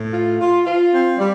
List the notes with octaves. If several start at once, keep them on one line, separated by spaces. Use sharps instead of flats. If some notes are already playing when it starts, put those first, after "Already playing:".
Already playing: A2
F4
F4
F4
C4
G3